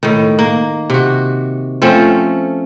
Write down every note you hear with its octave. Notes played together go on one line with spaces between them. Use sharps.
A2 D#3
A#3
C3 F#4
F3 A3 C4 C#4